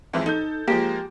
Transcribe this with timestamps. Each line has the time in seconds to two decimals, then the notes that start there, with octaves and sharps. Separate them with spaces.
0.13 F2 G#2 E3
0.26 D#4 A4 G6
0.68 F3 G#3 A#3 G4